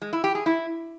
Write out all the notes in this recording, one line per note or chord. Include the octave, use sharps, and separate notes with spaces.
G#3
E4
G4
G#4
E4